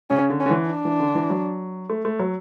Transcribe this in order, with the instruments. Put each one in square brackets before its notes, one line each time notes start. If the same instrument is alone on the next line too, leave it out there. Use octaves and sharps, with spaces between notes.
[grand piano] C#3 [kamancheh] C#4
[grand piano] D3
[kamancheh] C#4
[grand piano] D3
E3
[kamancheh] D4
[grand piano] E3
D3
E3
F#3
A3
A3
F#3